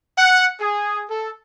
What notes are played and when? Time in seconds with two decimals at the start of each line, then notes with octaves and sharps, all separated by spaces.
0.18 F#5
0.61 G#4
1.10 A4